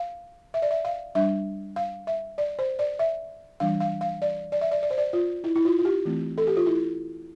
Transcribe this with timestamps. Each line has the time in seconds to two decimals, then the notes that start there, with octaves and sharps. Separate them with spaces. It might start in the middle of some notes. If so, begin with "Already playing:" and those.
Already playing: F5
0.54 E5
0.62 D5
0.71 E5
0.85 F5
1.15 G3 D4 E5
1.76 F5
2.07 E5
2.38 D5
2.59 C5
2.79 D5
2.99 E5
3.60 E3 G3 D4 F5
3.80 F5
4.01 F5
4.22 D5
4.52 D5
4.61 E5
4.71 D5
4.83 D5
4.91 C5
4.98 D5
5.13 F4
5.44 E4
5.56 E4
5.65 F4
5.79 F4
5.85 G4
6.05 E3 A3 C4
6.38 A4
6.47 G4
6.57 F4
6.66 E4